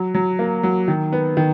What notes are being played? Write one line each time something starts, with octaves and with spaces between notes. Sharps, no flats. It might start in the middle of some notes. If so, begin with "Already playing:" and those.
Already playing: F#3
F#3
A#3
F#3
D#3
B3
D#3